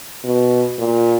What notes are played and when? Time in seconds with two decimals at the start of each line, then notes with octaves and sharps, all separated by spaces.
0.24 B2
0.78 A#2